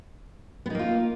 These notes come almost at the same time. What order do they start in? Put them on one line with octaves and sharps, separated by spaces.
B3 D#4 A#3 F4